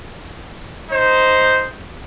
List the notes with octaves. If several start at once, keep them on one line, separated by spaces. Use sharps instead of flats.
D#4 C5